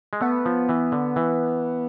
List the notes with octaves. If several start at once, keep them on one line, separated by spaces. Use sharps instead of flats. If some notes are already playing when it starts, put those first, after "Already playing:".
G#3
A3 B3
F3
E3
D3
E3